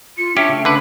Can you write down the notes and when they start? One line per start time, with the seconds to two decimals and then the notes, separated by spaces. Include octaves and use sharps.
0.18 F4 C#7
0.37 C#4 D4 G4 E5
0.49 C#3 A3
0.65 D3 D4 B4 B5